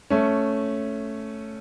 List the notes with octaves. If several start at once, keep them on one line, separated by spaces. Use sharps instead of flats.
A3 C#4